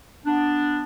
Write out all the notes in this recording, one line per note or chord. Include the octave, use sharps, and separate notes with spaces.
B3 D4